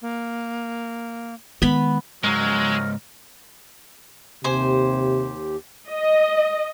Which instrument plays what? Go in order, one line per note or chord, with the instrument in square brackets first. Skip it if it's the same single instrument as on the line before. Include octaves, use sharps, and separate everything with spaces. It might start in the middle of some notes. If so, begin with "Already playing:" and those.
[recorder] A#3
[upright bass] D#3 G#3 [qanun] B3 B5
[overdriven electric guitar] C#2 G#2 [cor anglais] F#3 [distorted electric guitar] G#3 [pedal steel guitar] A#4
[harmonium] D#2 G4 [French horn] C3 [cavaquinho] C5 G#5
[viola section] D#5